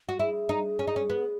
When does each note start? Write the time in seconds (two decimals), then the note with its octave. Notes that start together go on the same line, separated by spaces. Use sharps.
0.09 F#4
0.19 E4 G#4
0.49 D#4
0.79 C#4
0.87 D#4
0.96 C#4
1.10 B3